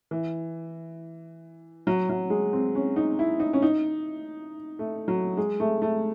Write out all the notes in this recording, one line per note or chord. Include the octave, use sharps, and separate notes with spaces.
E3
F#3
F#3
G#3
C4
C#4
D#4
E4
D#4
C#4
D#4
A3
F#3
G#3
A3
A3